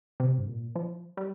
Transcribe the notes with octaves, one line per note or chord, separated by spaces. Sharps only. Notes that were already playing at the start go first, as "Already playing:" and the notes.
C3
G2
A#2
F3
G3